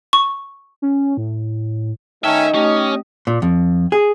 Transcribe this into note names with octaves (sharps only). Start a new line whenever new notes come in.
C#6
C#4
A2
D#3 A3 C#4 D#4 E5 G5 A5 F6
A3 C#4 G4 D#5
A#2
F2
G#4